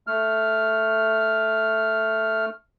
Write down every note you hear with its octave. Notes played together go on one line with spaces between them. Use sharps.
A3 F6